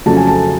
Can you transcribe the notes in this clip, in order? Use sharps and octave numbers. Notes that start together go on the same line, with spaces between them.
F2 C#3 F#3 A3 A5
G#5
A5